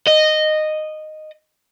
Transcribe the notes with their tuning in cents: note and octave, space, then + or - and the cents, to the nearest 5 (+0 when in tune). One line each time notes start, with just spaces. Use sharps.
D#5 -10